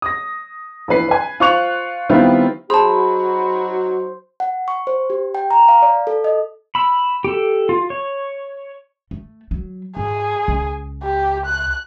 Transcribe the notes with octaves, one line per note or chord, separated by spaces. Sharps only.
D#6 A#6
A#1 E3 B4 C7
B4 G#5
F4 C5 C#6 F#6 F7
D#3 G3 B3 C4 E4 F4
F#3 D#4 F#4 G#4 C5 A5 B5
F#5
C#6
C5
G4
G5
A#5
F5
D5
A4
D#5
B5 E6
G4 A4
F4
C#5
A3
F#3
G#2 G#4
C#2
G4
F#6